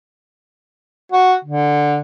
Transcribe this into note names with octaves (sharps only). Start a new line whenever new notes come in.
F#4
D3